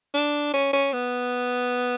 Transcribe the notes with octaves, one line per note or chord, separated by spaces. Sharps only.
D4
C#4
C#4
B3